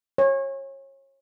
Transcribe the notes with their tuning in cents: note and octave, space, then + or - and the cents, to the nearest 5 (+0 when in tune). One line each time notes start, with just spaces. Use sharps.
C#5 -30